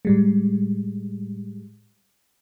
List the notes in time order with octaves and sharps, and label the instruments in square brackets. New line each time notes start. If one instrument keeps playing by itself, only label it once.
[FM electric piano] A2 G3 G#3